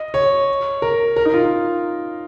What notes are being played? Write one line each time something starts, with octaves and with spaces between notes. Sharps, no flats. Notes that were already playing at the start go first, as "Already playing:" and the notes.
Already playing: D#5
C#5
A#4
A#4
D#4
F4